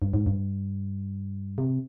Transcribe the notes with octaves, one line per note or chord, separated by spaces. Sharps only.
G2
G#2
G2
C3